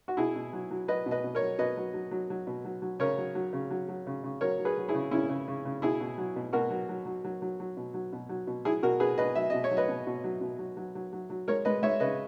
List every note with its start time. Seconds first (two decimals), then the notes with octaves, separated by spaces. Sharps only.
0.08 F#4
0.17 B2 E4 G#4
0.35 B2
0.53 F#3
0.71 F#3
0.88 F#3 B4 D#5
1.06 B2
1.11 B4 D#5
1.24 B2
1.35 A#4 C#5
1.42 F#3
1.58 B2 B4 D#5
1.77 F#3
1.94 F#3
2.11 F#3
2.30 F#3
2.47 B2
2.65 F#3
2.82 F#3
3.00 C#3 A#4 C#5
3.18 F#3
3.35 F#3
3.53 C#3
3.70 F#3
3.88 F#3
4.07 C#3
4.24 C#3
4.41 F#3 A#4 C#5
4.58 F#3
4.65 G#4 B4
4.77 F#3
4.88 E4 G#4
4.94 C#3
5.11 C#3 C#4 E4
5.29 C#3
5.48 C#3
5.65 C#3
5.82 B2 E4 G#4
6.00 B2
6.18 F#3
6.36 B2
6.53 B2 F#4 A#4
6.71 F#3
6.89 F#3
7.06 F#3
7.24 F#3
7.42 F#3
7.60 F#3
7.77 B2
7.94 F#3
8.13 B2
8.29 F#3
8.47 B2
8.65 F#3 E4 G#4
8.83 B2 F#4 A#4
9.00 B2 G#4 B4
9.17 B2 B4 D#5
9.35 F#3 E5
9.50 B2 D#5
9.64 C#5
9.71 F#3
9.77 B4 D#5
9.88 B2
10.07 B2
10.24 F#3
10.41 B2
10.59 F#3
10.77 F#3
10.95 F#3
11.13 F#3
11.30 F#3
11.48 G#3 A#4 C#5
11.65 G#3 B4 D#5
11.82 G#3 C#5 E5
12.00 C#3 B4 D#5